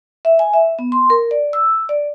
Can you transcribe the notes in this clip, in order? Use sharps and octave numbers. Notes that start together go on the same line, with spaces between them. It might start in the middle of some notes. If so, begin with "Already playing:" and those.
E5
G#5
E5
B3
C6
A#4
D5
E6
D5